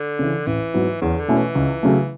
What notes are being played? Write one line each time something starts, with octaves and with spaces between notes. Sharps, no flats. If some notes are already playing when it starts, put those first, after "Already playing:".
Already playing: D3
C#3 E3
A1 E3
G#2 F#3 B3 E4
E2 C#3
D3
B2 A3 C#4 E4
E3
C#2
C#3 F#3 A3